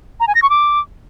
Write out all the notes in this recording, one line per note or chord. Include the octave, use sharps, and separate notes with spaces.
A#5
G#5
A#6
C#6
D6